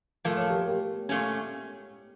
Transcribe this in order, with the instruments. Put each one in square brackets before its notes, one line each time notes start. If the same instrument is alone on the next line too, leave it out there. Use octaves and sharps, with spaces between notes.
[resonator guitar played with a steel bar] A#2 F3 A3 [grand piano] A#4
[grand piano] C#5
G4 A#4
G4 A#4
[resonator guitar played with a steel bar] A#2 A3 C#4